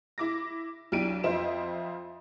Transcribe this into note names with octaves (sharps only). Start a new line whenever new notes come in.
E4 D6 A#6
B1 D4 E4 G4 D7 D#7
F2 F4 C5 D#5 E5 E7